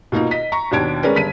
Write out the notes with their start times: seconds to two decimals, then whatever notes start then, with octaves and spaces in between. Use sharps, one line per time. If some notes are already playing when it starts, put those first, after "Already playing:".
0.12 B2 A#3 D#4 F4
0.31 D#5 B6
0.52 A#5 C#6
0.71 D#2 B2 D4 G#6 D7
1.03 G#3 C#4 A#4 B4 D5
1.15 G1 B6 D#7